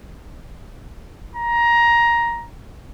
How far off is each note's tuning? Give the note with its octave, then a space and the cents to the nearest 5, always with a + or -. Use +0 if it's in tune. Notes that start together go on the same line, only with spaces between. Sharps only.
A#5 +15